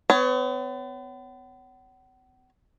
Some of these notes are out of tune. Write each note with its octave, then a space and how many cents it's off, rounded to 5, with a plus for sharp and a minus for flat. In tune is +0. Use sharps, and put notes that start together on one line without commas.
B3 +40 C#5 +10